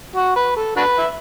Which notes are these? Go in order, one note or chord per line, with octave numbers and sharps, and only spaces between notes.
F#4
B4
A4
D4 F#4 B4
E5